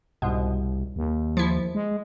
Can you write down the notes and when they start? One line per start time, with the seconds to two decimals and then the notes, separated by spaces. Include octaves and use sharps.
0.22 C2 G#2 B2
0.96 D#2
1.37 F3 E4
1.75 G#3